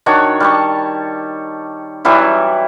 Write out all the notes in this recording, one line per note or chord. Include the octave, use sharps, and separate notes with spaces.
D#3 D4 F#4 C#5
G3 A5 C#6
E3 F#3 G3 E4